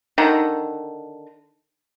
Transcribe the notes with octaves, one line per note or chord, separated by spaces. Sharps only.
D3 D#3 A#5